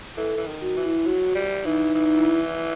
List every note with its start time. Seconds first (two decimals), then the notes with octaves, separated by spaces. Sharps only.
0.17 E3 A4
0.37 E3
0.47 D#3
0.61 F#4
0.77 E3
0.83 E4
1.06 F#3 F#4
1.35 G3
1.65 E3 D#4
1.95 E3 D#4
2.06 D#4
2.16 E4